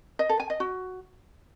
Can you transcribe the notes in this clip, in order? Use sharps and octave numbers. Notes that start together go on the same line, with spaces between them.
D#5
A4
G#5
D#5
F#4